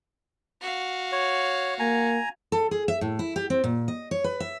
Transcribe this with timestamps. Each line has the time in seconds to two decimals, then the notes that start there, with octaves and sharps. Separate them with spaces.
0.61 F#4 F5
1.12 C#5
1.79 A#3 G#5 A#5
2.52 A4
2.71 G#4
2.88 E5
3.01 A2
3.19 E4
3.36 G4
3.50 C4
3.64 A#2
3.88 D#5
4.11 C#5
4.24 B4
4.40 E5